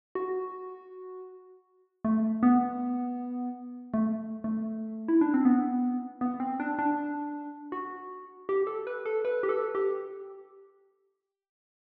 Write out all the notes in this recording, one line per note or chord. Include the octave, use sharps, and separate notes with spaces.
F#4
A3
B3
A3
A3
E4
D4
C4
B3
B3
C4
D4
D4
F#4
G4
A4
B4
A4
B4
G4
A4
G4